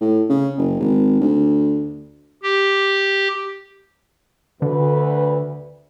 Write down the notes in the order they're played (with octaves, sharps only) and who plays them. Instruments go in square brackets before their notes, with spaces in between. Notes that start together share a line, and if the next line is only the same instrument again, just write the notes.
[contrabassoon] A2
C#3
F#1
G#1
D2
[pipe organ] G4
[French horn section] D2 B4 [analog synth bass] D3